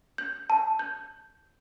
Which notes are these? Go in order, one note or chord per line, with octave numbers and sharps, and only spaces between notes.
G6
A5
G6